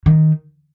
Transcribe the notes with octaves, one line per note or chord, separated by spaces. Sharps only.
D#3